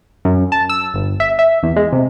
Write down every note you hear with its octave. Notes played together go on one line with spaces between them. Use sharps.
F#2
A5
E6
G1
E5
E5
E2
G#3
C3